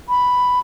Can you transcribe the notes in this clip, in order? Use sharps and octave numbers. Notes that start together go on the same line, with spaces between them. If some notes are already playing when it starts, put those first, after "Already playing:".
B5